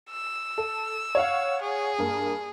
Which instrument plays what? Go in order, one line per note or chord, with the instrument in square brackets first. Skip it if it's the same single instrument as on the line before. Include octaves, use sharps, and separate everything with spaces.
[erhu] E6
[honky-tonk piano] A4
C#5 F5 F#5
[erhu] G#4
[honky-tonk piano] G2 A#3